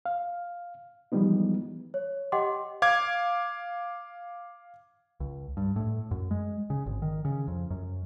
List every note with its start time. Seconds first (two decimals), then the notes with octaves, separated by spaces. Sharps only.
0.06 F5
1.12 E3 F3 G3 G#3 B3 D#4
1.94 C#5
2.32 G4 D#5 F#5 G5 C6 D6
2.82 F5 D6 G#6
5.20 C#2
5.57 G2
5.76 A2
6.11 F#2
6.31 G#3
6.70 C#3
6.86 G#1
7.02 D#3
7.25 C#3
7.48 F2
7.70 F#2